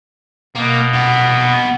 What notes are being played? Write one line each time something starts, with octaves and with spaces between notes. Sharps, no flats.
B2 A#3
C2 B3